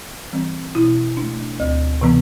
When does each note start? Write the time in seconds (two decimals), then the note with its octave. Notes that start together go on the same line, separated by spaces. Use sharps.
0.33 E3 G3 C4
0.75 B2 E4
1.17 A3 D4
1.60 D2
2.01 C3 E3 B3